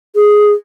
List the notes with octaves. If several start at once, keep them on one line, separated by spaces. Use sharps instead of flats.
G#4